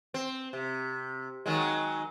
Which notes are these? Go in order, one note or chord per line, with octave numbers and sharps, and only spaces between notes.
C4
C3
D#3 F#3 G#3